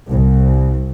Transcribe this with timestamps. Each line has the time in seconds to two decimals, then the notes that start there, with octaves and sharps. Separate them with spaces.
0.12 C2